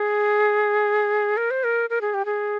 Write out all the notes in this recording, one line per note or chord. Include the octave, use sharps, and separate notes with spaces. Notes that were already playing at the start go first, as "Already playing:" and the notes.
Already playing: G#4
A#4
C5
A#4
A#4
G#4
G4
G#4